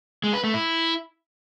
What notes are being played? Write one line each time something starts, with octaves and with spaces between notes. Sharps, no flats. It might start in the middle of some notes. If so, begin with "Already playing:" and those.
G#3
B4
A3
E4